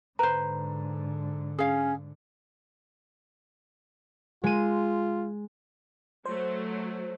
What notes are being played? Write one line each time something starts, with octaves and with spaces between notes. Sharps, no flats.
G#2 D3 B4 C5 A#5
C#4 G#4 F5
G#3 F4 D#7
F#3 A3 C5